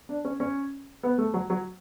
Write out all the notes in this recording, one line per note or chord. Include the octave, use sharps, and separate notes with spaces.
D4
C#4
C#4
B3
A3
F#3
F#3